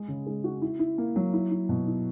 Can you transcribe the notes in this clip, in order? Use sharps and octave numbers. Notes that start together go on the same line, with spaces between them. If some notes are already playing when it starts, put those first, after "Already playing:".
Already playing: G#3 G#4
C#3
G#3
F#4
E4
E4
A#3
F#3
E4
E4
B2
E4